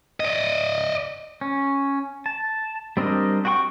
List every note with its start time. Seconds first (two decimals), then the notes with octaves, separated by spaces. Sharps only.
0.20 D5 D#5
1.41 C#4
2.26 A5
2.97 G3 C4 D4 A#4 D#5
3.45 F#4 F#5 G5 C6 C#6